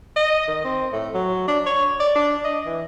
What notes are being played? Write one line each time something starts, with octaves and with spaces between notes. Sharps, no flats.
D#5
D#3
C4
A2
F#3
D4
C#5
D5
D4
D#5
E3